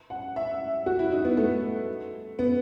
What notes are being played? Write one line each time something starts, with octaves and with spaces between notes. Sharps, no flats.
F#5
E5
F#4
E4
D#4
B3
A3
B3